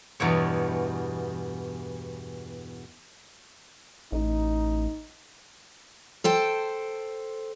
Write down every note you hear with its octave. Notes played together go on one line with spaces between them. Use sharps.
E2 G2 B2 C#5
A1 D#4
A4 C5 G5